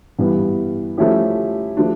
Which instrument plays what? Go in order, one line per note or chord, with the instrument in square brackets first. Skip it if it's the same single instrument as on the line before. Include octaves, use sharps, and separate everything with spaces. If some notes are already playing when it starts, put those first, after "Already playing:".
[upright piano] G2 E3 G3 B3
F3 A3 C#4 E4 G4
F3 A3 D4